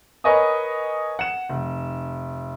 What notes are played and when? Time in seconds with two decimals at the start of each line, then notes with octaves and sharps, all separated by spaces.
0.24 A#4 B4 C#5 D#5 G#5 D#6
1.19 F#5 E7
1.49 F1